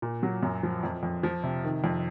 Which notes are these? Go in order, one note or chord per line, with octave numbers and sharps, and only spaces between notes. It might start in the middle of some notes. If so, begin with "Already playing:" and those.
A#2
F#3
F#2
F3
F2
F2
F3
C3
D#3
F2